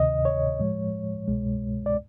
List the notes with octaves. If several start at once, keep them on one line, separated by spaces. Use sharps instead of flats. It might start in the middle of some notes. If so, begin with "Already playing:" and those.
Already playing: D2 C3 D#3 D#5
C#5
A2 F3 G#3
C2 B2 G#3
D5